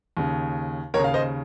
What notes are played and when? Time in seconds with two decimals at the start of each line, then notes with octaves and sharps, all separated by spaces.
0.17 D#2 C#3
0.94 D#2 A#4 C#5
0.99 C#3 F5
1.14 C5 D#5